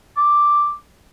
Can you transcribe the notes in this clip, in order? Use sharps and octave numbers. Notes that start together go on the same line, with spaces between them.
D6